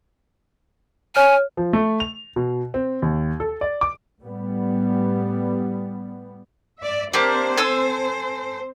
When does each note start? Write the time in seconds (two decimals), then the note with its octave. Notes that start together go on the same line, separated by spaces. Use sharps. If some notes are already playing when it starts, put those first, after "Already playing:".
1.16 C#5 G#5 F6
1.57 F3
1.73 A3
2.00 F7
2.36 B2
2.74 C4
3.02 D#2
3.40 A4
3.61 D5
3.81 D6
4.22 A2 G3 B3
6.79 D5 E5
7.13 A#3 C4 D4 G4 C5
7.57 A4 G#5 E6